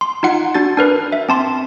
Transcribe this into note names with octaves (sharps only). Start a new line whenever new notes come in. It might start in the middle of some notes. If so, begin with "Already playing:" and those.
C6
D#4 F4 F#5 C#7
D4 F#4 A6
D4 A#4 B4
E5
C4 A5 C6